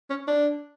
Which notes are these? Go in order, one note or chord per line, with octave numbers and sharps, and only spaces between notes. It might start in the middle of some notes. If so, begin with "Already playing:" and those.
C#4
D4